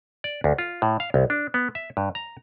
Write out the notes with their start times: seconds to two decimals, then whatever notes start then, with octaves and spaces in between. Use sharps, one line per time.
0.24 D5
0.44 D2
0.58 F4
0.82 A2
1.00 F5
1.14 C2
1.30 D4
1.54 B3
1.75 E5
1.97 G2
2.15 A#5